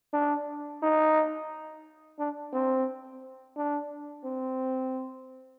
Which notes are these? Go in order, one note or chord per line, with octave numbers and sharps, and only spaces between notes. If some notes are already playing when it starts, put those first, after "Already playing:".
D4
D#4
D4
C4
D4
C4